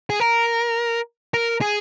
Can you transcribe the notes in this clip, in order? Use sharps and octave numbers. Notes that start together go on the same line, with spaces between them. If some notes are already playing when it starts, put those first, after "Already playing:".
G#4
A#4
A#4
G#4